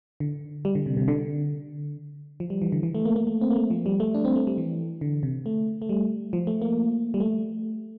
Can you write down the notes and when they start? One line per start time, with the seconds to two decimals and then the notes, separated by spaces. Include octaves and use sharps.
0.20 D3
0.65 G3
0.75 D3
0.86 C3
0.97 C3
1.08 D3
2.40 F3
2.50 G3
2.62 E3
2.72 D3
2.83 E3
2.95 A3
3.05 A#3
3.16 A#3
3.27 A3
3.41 C4
3.51 A#3
3.56 A3
3.70 F3
3.86 G3
4.00 A3
4.14 D4
4.25 C4
4.36 A3
4.47 G3
4.58 E3
5.01 D3
5.23 C3
5.46 A3
5.82 A3
5.89 G3
6.33 F3
6.47 A3
6.62 A#3
7.14 G3
7.20 A3